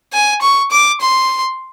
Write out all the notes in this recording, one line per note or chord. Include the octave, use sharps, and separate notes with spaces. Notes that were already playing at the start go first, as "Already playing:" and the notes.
G#5
C#6
D6
C6